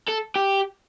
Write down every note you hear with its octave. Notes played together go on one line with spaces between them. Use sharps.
A4
G4